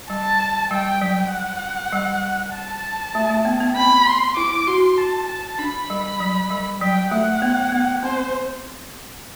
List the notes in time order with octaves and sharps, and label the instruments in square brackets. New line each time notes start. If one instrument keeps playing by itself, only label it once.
[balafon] G3 [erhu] A5
[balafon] G3 [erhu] G5
[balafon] F#3
[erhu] F#5
[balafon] G3
[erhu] A5
[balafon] A3
A3
B3
B3
[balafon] C4 [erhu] B5
[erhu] C6
[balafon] E4 [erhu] D6
[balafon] F#4 [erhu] C6
[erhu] A5
A5
[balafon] D4 [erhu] B5
[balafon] G3
F#3
G3
[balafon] F#3 [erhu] G5
[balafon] A3 [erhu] F#5
[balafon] B3
B3
[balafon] C4 [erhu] C5